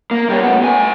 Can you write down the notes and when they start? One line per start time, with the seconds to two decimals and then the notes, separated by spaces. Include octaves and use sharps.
0.11 A#3
0.30 G3 C#4
0.43 A2 B3
0.62 A2 G#5